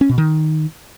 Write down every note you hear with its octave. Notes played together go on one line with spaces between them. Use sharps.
C#4
B2
D#3